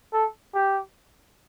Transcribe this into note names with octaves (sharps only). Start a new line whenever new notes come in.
A4
G4